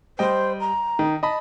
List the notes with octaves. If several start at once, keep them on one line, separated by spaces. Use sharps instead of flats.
G3 C5 D#5 G5
A#5
D#3
D#5 A5 B5